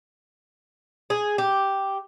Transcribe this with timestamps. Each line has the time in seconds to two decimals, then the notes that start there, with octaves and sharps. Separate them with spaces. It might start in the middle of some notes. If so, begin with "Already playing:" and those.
1.10 G#4
1.38 G4